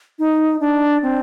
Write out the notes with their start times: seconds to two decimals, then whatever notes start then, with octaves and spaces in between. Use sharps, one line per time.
0.19 D#4
0.60 D4
1.02 C4